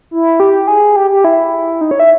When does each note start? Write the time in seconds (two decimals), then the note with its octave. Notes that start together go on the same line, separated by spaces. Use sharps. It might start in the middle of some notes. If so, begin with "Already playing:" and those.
0.11 E4
0.40 G4
0.68 G#4
0.96 G4
1.10 G4
1.24 E4
1.81 D#4
1.91 C#5
2.00 E5